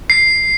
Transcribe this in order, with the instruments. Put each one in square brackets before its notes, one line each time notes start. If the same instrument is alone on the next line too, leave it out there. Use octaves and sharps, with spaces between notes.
[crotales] C7